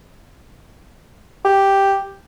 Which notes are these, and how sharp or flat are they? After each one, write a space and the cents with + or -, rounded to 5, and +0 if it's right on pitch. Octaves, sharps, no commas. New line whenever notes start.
G4 +0